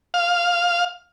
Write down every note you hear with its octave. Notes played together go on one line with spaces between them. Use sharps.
F5